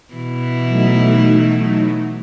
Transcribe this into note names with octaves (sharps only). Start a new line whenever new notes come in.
B2 E3 E4
F#3 A3 D#4